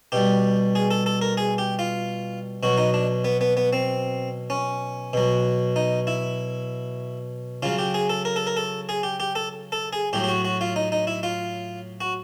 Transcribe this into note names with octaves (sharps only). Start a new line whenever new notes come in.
B2 G3 G4
G#4
A4
A4
A#4
G#4
G4
F4
B2 F#3 F#4
D#4
D4
B3
B3
B3
C4
C#4
B2 F#3
D#4
E4
C#3 F#3 F4
G4
G#4
A4
A#4
A4
A#4
A4
G#4
G4
G4
A4
A4
G#4
A2 F#3 G4
G4
F#4
F#4
F4
D#4
D#4
E4
F4
F#4